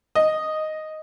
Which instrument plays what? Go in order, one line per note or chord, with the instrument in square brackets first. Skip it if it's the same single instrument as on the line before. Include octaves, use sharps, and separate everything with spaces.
[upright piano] D#5